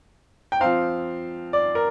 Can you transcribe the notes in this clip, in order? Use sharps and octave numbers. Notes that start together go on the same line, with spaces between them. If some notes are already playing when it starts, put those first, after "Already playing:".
G5
F3 C4 F5
D5
A#4